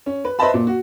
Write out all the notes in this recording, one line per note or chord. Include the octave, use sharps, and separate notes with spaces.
C#4
B4
B4 C5 D#5 E5 A5 B5
A#2
F#4